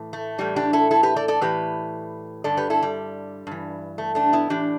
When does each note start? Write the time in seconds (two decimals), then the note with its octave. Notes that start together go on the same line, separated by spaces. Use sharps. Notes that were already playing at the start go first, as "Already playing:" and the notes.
Already playing: A2 E3
0.13 A3
0.38 A2 E3 G3
0.56 D4 G4
0.73 E4 A4
0.91 E4 A4
1.03 G4 B4
1.16 A4 D5
1.28 A4 D5
1.41 A2 E3 G4 B4
2.44 G2 D3 A4 D5
2.57 G4 B4
2.70 E4 A4
2.83 G3
3.47 G2 E3
3.98 A3
4.15 A3 D4
4.33 B3 E4
4.50 A2 E3 D4 G4